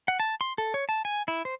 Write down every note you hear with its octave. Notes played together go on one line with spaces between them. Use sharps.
F#5
A5
C6
A4
C#5
A5
G#5
E4
C5